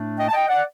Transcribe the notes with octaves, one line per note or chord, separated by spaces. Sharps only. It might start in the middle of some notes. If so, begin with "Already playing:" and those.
Already playing: A2 A3 D4
D#5 G5
A5
D#5 G5
D5 F#5